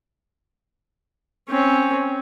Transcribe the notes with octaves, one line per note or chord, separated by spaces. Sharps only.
C4 C#4